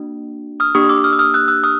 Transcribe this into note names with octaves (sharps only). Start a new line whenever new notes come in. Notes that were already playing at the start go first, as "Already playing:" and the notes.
Already playing: A#3 D4 F#4
D#6 F6
A#3 D4 G4 C#6 D#6
D6 E6
D#6 F6
E6
D#6 F6
E6 F#6
E6 F#6
D#6 F6